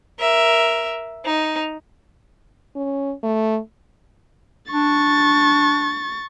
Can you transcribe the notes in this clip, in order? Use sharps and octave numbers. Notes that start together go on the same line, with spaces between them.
A#4 E5
D#4
C#4
A3
D4 C#6 A6